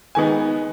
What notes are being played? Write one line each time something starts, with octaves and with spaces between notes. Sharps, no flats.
D#3 G#3 B3 D#4 G#5